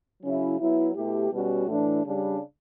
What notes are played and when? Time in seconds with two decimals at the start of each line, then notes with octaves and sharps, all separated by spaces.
0.22 C#3 F#3 C#4 E4
0.58 F#3 B3 E4
0.94 B2 A3 E4 G4
1.30 B2 G3 C#4 F#4
1.66 A2 E3 A3 D4
2.03 C#3 G3 D4